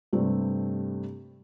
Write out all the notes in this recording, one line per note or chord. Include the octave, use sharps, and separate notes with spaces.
G2 C3 G3 A3 C4